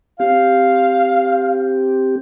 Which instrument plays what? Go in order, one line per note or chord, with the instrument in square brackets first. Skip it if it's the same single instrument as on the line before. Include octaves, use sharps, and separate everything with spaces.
[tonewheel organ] C4 G4 [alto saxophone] F5